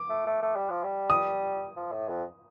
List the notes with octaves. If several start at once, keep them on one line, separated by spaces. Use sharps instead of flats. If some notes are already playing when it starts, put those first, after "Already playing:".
Already playing: D6
A3
A3
A3
G3
F3
G3
D#6
F3
A2
F2